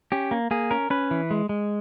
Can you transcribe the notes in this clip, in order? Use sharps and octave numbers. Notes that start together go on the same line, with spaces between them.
C#4 G4
A#3
A#3 G#4
C#4 A#4
C#4 B4
E3
G#3
G#3